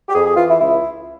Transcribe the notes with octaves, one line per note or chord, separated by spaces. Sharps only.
G4
F2 G#4
G#4
E3 F4
E4
C#2 E4